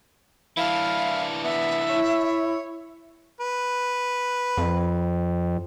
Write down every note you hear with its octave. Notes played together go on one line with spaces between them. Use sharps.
E3 D4 E4 F5
B3 E5
E4 C#5
B4
F2